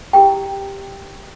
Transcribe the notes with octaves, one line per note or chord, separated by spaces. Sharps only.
E4 G4 A#4 G5